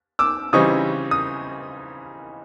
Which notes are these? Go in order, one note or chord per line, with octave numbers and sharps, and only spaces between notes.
D6 E6
C#3 E3 G3 C4 D#4 C#6 D#6
D#6